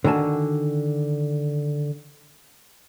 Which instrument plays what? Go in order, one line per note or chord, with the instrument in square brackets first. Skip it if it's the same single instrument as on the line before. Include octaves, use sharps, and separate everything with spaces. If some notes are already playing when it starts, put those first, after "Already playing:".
[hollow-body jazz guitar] D3 D#3 F#4 G#5 A5